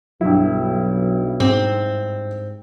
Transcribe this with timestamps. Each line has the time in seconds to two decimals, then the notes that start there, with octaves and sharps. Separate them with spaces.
0.21 B1 G2 F#3 E4
1.40 G#2 C4